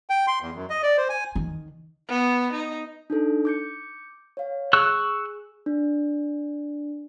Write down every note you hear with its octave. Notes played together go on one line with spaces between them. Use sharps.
G5
C6
E2
F#2
D#5
D5
C5
G#5
D#3
B3
D#4
D4 D#4 A4
D6 G6 C#7
C#5 F5
G#4 C#6 E6 F#6
D4